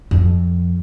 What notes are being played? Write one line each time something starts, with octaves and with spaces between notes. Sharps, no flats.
F2